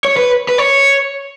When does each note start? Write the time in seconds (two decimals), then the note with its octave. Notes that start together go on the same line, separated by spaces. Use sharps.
0.05 C#5
0.17 B4
0.49 B4
0.58 C#5